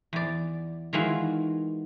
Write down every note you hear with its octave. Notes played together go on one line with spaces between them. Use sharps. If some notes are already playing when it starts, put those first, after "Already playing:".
E2 D5
D#3 E3 G#3 F4 F#4